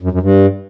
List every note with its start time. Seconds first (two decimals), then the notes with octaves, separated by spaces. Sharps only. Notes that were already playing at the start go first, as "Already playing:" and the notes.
0.01 F#2
0.12 F#2
0.22 G2